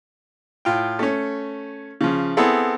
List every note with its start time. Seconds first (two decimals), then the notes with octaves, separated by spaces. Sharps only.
0.65 A2 F4 G5
0.99 A3 C#4
2.01 C#3 F3
2.37 B3 C4 E4 G#4 A4